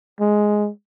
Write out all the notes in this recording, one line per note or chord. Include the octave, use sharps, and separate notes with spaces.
G#3